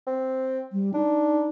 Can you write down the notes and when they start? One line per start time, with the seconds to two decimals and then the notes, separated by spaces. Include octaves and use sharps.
0.07 C4
0.72 G3
0.94 D4 D#4